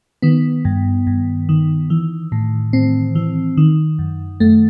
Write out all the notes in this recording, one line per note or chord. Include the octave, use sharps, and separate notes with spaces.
D#3 B3
G2
G2
D#3
E3
A2
A2 C4
E3
D#3
F#2
F#2 A3